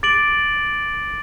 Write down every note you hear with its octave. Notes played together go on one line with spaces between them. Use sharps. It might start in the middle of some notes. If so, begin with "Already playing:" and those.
D6 A6 D7 F#7